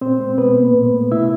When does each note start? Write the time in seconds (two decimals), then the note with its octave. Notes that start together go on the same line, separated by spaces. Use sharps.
0.01 A#2 C4 C5
0.20 G#3
0.38 B2 B3 B4
0.57 A#3
0.74 A#2
0.93 A3
1.12 C3 E4 E5